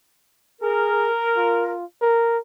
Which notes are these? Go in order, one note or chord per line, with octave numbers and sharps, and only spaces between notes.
G#4 A#4
F4
A#4